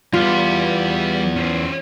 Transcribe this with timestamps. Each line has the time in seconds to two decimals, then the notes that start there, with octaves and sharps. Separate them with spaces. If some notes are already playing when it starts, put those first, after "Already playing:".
0.13 E2 G3 B3 F4
1.36 C#4 C5